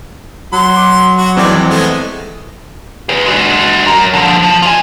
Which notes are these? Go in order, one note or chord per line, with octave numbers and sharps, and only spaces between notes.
F#3 C6
D6
F#4
F2 E3 G#3 C4 D5
G#3 A3 B3
G#4 B4
G#3 F#4
F#3 A#4
D3 F3
F3
F4 G#5